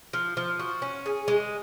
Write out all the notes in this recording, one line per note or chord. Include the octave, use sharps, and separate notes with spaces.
F3
F3
F#4
C#4
G#4
G#3